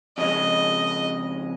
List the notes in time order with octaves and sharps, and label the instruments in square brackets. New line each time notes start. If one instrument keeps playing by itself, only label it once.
[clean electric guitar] F2 C#3 G#3 [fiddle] D#5